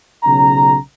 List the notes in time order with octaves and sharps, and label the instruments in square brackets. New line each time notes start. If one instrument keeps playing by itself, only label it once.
[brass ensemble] B1 C#3 C#4 A#5